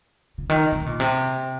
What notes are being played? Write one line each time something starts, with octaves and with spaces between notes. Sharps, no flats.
C#3
D#3
C3
A#2
C3